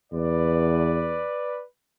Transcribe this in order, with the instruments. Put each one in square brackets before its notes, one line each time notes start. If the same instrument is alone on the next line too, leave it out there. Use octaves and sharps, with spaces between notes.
[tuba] E2 [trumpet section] B4 D5